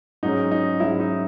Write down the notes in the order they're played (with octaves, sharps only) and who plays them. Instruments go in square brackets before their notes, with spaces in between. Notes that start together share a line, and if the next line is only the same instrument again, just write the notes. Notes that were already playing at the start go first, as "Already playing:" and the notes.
[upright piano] G#2 F#3 C#4 G#4 [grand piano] D#4
[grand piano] D#4
[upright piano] G#2 F#3 C#4 G#4 [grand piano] E4
[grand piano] D#4